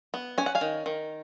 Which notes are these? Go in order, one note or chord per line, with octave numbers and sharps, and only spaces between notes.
B3
C#4 G#5
F#5
F5 G#5
D#3
D#3